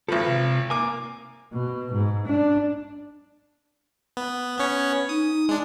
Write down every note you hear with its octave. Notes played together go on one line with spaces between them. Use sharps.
G#1 F3 A4 B4
C3
A#3 G#5 D6
B2
G#2
D4
B3
B3 C#4 C#5
D#4 D#6
G#3 D4